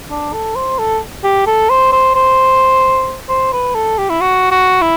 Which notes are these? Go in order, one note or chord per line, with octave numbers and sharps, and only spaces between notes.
D4
A4
C5
A4
G4
A4
C5
C5
C5
C5
B4
A4
G4
E4
F#4
F#4
E4